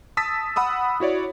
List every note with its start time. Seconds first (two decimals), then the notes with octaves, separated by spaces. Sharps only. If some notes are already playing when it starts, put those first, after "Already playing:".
0.17 A5 D#6 E6 A6 B6
0.56 F#5 B5 D#6 E6
1.00 E4 F#4 C#5 D5